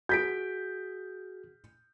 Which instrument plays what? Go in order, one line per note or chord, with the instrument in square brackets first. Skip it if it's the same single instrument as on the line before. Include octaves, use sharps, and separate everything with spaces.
[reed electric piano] F#4 G#4 [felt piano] G6 B6 D7